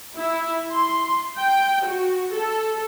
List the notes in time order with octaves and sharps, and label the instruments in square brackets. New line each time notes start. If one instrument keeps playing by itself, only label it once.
[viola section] E4
C6
G5
F#4
A4